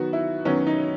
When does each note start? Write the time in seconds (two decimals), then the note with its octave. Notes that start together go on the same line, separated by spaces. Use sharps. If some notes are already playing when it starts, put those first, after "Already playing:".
Already playing: D#3 F#3 B3 F#4
0.13 E4
0.45 D#3 F#3 B3 C#4
0.67 D#4